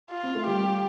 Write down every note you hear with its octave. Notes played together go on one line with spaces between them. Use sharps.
F4
C4
A3
G3 G4